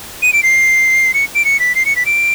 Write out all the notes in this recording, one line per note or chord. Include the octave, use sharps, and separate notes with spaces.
D#7
D7
C7
C#7
D7
C#7
B6
C7
C#7
B6
D7